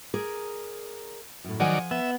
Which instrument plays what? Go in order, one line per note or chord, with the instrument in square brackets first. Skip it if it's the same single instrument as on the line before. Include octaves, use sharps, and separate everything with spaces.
[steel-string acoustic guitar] G#4 A#4 D5
F#2 A2
[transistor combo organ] D#3 F#3 D5 [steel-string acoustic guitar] F3 F#5 G#5
[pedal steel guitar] B3 [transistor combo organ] E5